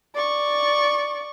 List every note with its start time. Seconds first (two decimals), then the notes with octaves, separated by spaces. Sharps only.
0.15 D5 C#6